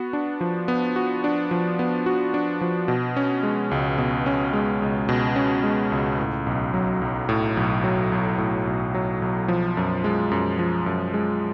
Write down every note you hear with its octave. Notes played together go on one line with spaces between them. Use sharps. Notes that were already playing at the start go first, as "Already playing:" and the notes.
Already playing: B3 F#4
D4
F3
B3
F#4
D4
F3
B3
F#4
D4
F3
B2
C#4
G#3
C#2
B2
C#4
G#3
C#2
B2
C#4
G#3
C#2
A2
B1
F#3
B1
A2
B1
F#3
B1
A2
B1
F#3
B1
F3
F#2
G#3
F#2
F3
F#2
G#3